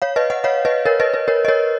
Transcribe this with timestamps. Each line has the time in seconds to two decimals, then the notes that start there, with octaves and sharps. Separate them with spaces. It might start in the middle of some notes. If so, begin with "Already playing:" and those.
0.02 C#5 F5
0.16 B4 D#5
0.30 D#5 F#5
0.44 C#5 F5
0.65 B4 D#5
0.85 A#4 C#5
1.00 B4 D#5
1.14 B4
1.28 A#4 C#5
1.45 D#5
1.48 A#4 C#5